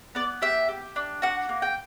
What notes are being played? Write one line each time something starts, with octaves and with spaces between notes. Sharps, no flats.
B3 D5
G4 E5
G4
D4
F#4 F#5
A#3
G5